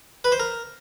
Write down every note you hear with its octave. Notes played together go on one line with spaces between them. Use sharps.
B4
C5
A#4